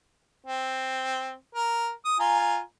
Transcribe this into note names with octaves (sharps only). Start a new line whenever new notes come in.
C4
A#4
D#6
F4 G#5 A#5